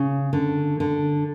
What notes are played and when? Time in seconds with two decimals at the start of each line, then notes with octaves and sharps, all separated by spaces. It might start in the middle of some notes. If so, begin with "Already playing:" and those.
Already playing: C#3
0.33 D3
0.80 D3